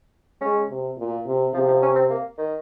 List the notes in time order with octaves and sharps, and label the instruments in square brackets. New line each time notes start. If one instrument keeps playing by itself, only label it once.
[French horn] G#3 [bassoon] C#4
[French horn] C3
A#2
C3
[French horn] C3 [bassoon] F3
[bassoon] F3
C#4
C4
A#3
D#3